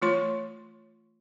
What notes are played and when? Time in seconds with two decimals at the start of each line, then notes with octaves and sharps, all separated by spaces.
0.02 E3 A3 F4 C#5 C6 C#6